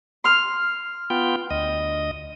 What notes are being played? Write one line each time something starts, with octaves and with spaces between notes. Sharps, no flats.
C6 F6
B3 F4 G5
D2 D#5